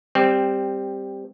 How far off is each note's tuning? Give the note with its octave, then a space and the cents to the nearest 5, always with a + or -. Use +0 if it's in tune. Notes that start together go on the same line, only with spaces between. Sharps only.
G3 +10 C4 +0